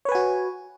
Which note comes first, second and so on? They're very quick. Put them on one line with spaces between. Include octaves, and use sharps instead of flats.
C#5 B4 G#5 F#4